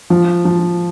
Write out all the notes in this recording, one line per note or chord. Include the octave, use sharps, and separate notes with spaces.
F3
F3